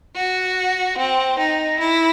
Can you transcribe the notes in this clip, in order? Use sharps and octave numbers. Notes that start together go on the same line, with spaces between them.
F#4
C4
D#4
E4